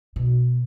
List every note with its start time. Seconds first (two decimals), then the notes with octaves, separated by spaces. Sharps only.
0.16 B2